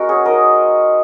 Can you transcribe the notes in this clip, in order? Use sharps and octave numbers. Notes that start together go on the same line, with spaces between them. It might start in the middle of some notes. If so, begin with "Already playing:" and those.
Already playing: G#3 A#3 C#4 F#4 A#4 F#5
G#4 C#5
G#3 D#4 A#4 D#5